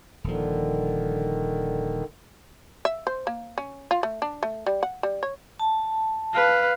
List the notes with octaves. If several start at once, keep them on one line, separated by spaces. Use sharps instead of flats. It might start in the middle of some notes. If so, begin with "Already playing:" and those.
D#1 D3 D#3 F3
E5
C5
A#3
C#4
F4
A3
D4
A3
G3
F#5
G3
C#5
A5
B4 F5